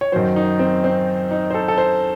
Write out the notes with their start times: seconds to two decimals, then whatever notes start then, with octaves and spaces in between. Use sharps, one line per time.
0.01 C#5
0.12 F#2 D#3 F#3 C5
0.36 D#4
0.59 C4
0.84 C4
1.31 D#4
1.51 C5
1.54 A4
1.68 A4
1.78 C5